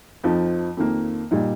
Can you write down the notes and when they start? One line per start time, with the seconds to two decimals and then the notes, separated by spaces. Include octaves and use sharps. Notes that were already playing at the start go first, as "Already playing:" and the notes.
0.24 F2 F3 D#4
0.77 F2 D#3 A#3
1.31 A#2 G3 D#4